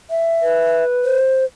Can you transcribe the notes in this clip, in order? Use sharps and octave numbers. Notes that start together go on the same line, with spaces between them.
E5
B4
C5